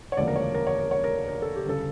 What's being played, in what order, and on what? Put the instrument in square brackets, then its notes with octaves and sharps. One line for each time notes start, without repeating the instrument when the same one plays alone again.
[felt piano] C#5
E1 D2 C#3 F3 A#3 D5
A#4
C#5
A#4
C#5
A#4
C#5
A#4
A#4
A4
G4
G1 C#3 A4